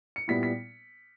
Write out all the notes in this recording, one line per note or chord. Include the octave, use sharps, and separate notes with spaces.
C#7
A#2 G3 B3 E4 B6
B6